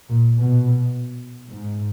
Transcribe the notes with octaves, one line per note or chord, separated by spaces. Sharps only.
A#2
B2
G#2